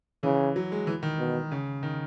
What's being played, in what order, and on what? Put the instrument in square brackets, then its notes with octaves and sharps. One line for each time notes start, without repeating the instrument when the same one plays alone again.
[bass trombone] C#3 [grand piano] E3
[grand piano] F#3
G#3
E3
D#3
[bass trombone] B2
[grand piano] C#3
D#3